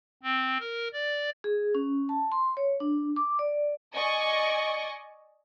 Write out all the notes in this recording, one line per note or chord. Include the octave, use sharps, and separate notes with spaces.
C4
A#4
D5
G#4
C#4
A5
C6
C#5
D4
D6
D5
D5 D#5 G#5 C#6